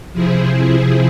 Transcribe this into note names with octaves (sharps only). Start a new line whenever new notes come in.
C3 F3 C4 E4 G#4